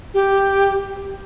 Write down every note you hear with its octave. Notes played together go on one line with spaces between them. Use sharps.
G4